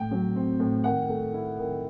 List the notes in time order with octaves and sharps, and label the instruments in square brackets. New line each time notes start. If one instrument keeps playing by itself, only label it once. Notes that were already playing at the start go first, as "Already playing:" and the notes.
Already playing: [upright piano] A2 G5
F#3
C4
A2
D#3 F#5
A3
E4
D#3